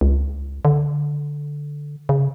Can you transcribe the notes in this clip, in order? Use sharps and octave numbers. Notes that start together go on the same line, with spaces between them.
C#2
D3
C#3